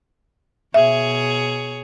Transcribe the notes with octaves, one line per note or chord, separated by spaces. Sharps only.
B2 G#4 C#5 E5